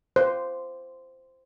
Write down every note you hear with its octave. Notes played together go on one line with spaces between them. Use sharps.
C5